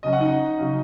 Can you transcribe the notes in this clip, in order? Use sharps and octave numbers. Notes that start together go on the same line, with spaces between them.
C#3 F#3 C#4 D#5
F#5
D#4 D#5
C#3 F#3 C#4